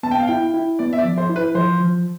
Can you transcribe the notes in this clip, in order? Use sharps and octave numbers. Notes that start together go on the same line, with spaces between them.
B3 A5
G5
F5
E4 G5
E4
B3 D5
E5
D5
F3
C5
E4
B4
F3 C5
F3